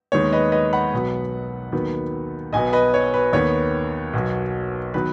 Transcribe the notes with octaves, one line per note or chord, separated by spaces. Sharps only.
D#2 D#3 G#3 B3 C#5
B4 D#5
B4 D#5
F#5 B5
B1 B2 F#3 B3
D#2 D#3 F#3 B3
B1 B2 F#3 B3 D#5 G#5
B4 D#5
C#5
B4
D#2 D#3 B3 C#5
B1 B2 F#3
D#3 F#3 B3 B4